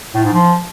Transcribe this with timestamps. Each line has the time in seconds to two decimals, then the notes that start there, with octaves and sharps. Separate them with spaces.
0.15 A2
0.24 G#2
0.33 F3